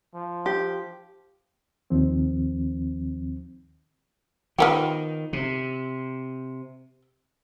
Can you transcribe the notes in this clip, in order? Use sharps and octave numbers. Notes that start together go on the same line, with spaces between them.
F3
G4
D#2 D#3 F3 C4
D#3 F3 B3 G4
C3